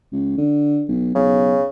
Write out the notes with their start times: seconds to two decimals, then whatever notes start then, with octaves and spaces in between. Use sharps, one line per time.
0.12 C#2
0.38 D3
0.88 B1
1.15 B1 C#3